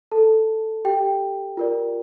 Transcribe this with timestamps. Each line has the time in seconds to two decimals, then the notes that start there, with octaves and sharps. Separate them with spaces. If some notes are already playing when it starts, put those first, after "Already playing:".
0.12 A4 A5
0.85 G4 G5
1.57 F4 A#4 D5